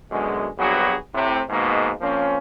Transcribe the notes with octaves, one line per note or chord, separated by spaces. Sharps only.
F#2 B2 D3 G#3
A#1 G2 F#3 B3 F#4 G#4
A2 C3
G#2 B2 D#3 G#3 A#3
F3 A#3 C4 C#4